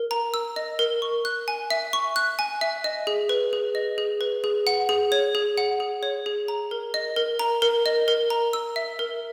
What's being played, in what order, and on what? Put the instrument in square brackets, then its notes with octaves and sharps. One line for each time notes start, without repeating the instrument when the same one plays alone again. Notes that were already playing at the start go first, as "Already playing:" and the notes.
Already playing: [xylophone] A#4
A#5
E6
D#5
A#4
C#6
F#6
G#5
E5
C#6
F#6
G#5
E5
D#5
G#4
B4
G#4
D#5
G#4
B4
G#4
F#5
G#4
C#5
G#4
F#5
G#4
C#5
G#4
A#5
A#4
D#5
A#4
A#5
A#4
D#5
A#4
A#5
E6
E5
A#4